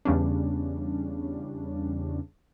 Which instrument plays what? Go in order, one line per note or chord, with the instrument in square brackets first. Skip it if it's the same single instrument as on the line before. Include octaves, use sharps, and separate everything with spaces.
[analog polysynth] E2 C#3 G3 C#4 D4